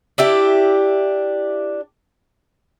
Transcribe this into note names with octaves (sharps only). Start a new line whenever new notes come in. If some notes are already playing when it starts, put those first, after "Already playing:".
D4 E4 G4